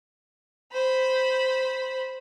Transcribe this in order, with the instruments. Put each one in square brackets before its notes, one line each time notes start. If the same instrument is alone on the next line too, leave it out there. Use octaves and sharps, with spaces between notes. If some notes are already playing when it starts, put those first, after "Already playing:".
[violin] C5 B5